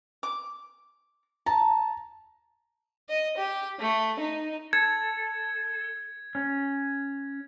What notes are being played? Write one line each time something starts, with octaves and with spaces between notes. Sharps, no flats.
D6
A5 A#5
D#5
G4
A3
D#4
A4 G#6
C#4